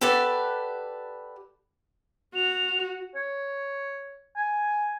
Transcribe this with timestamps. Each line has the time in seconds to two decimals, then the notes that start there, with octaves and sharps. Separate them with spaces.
0.01 G4 A4 B4 D5 F#5 A5
2.35 F#4 F7
3.15 C#5
4.37 G#5